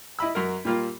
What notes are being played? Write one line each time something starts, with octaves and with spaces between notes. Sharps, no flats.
E4 D#5 B5 E6
F#2 F#4 A#4
A#2 G3 A#3 F4